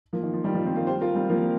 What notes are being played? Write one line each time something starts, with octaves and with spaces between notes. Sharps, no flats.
F3 A#3
D#3
F3
D#3 G3
F3 A#3
G3 C4
F4 A#4
G4 C5
F4 A#4
G3 C4
F3 A#3